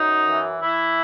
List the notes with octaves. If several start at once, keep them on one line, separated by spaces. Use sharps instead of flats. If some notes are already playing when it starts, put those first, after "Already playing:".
Already playing: F#2 D#4
E3
E3 E4